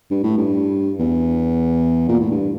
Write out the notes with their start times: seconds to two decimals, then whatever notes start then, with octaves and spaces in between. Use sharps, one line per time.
0.10 G2
0.23 A2
0.37 G2
0.99 E2
2.09 A#2
2.19 A2
2.31 G2